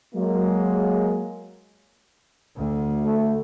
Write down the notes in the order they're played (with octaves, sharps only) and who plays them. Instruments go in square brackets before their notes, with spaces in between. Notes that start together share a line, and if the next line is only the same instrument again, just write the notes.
[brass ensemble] F#3 G#3 A#3
[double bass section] D2
[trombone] A3